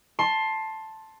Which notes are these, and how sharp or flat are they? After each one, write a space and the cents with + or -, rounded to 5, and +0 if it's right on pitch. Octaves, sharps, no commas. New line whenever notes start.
A5 +0 C6 +15